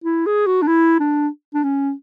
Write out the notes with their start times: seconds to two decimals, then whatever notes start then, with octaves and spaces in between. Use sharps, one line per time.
0.04 E4
0.26 G#4
0.46 F#4
0.62 D4
0.67 E4
1.00 D4
1.54 D4
1.63 C#4